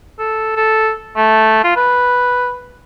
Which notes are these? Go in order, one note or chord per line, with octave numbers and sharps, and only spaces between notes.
A4
A4
A3
F4
B4